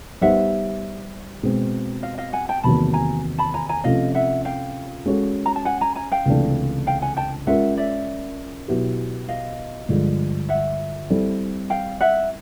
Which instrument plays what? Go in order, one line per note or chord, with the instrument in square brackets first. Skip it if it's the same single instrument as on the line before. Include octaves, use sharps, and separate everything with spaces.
[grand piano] G3 B3 D#4 G4 C5 [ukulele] E5 F#5
[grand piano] B2 G#3 C4
[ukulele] D#5 F5
D#5 F5
F#5 G#5
G5 A5
[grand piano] E2 C3 D#3 F#3 A#3 [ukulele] A5 B5
[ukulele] G#5 A#5
A5 B5
G#5 A#5
G#5 A#5
[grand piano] C3 F3 A3 C#4 F4 [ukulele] D#5 F5
[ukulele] E5 F#5
F5 G5
[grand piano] G#3 C#4 F#4 A4 C#5
[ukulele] A#5
A5
F#5 G#5
G#5 A#5
G#5 A#5
F5 G5
[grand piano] C#2 C3 E3 A3 D4
[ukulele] F5 G5
F#5 G#5
G5 A5
[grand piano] G#3 C#4 F4 A#4 [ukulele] E5 F#5
[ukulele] D5 E5
[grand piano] B2 F#3 B3 E4 G4
[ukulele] D#5 F5
[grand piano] G2 D3 F3 G#3
[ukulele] E5 F#5
[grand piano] G3 C4 E4 A4
[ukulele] F5 G5
E5 F#5